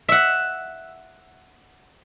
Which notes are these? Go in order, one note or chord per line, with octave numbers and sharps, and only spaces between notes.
E5 F#5